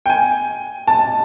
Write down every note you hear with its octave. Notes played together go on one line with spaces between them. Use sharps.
G5
G#5
A5